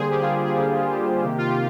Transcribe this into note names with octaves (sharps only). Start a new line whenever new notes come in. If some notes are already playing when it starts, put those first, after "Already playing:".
Already playing: D3 G3 A#3 G#4 C5
G4
F4 G#4
G#4
D3 G3 A#3 G4
F4
G4
C3 D#3 A#3 G4
F4
G4